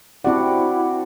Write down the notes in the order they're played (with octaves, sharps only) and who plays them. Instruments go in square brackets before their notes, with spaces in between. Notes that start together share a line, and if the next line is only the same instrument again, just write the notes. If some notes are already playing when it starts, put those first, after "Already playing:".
[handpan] C4 G4 F#5 [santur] D4 F#4 D5 [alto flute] E4